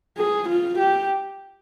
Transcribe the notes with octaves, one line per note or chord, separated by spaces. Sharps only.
G#4
F4
G4